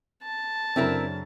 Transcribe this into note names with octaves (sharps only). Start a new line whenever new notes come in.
A5
F#2 C#3 C4 D4 E4 A#4